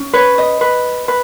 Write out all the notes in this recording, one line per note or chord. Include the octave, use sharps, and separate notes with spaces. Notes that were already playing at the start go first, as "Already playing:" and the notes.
Already playing: C#4
B4 C#5
D#5
B4
B4